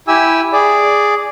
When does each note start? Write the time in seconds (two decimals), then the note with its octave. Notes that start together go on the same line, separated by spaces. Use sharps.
0.08 E4 G4 G#5 E6
0.53 G#4 D5